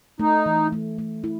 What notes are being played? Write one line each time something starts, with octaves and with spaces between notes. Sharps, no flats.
A3 D#4
E3
A3
A3
E4